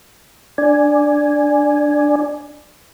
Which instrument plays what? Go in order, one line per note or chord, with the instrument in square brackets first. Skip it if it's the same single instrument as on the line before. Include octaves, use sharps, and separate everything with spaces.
[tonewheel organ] D4 D5 G#5